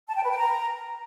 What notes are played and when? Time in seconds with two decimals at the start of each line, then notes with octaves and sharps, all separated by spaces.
0.08 A5
0.16 G5
0.23 B4
0.30 G5
0.38 A#5